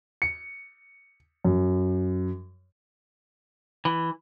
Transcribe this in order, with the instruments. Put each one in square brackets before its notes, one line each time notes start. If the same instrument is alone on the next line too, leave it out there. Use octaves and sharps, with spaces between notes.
[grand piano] C#7
F#2
[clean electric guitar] E3